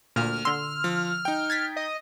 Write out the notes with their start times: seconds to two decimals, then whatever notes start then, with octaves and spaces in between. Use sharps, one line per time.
0.16 D2 A#2 F6
0.45 D3 C6 E6
0.84 F3
1.25 D#4 G5
1.50 G#6 A6 B6
1.76 D#5